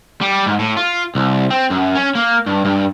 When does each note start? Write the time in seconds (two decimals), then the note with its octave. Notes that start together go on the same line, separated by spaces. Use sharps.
0.21 G3
0.46 G#2
0.59 A2
0.77 F4
1.15 C2
1.51 C4
1.71 F#2
1.96 C#4
2.16 A#3
2.47 G2
2.65 G2